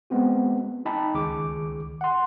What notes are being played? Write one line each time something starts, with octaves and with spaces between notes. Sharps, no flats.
G#3 B3 C4 F#4
D#4 D#5 G5 A5 B5
C#2 D#3 G#4 D6
F#5 C6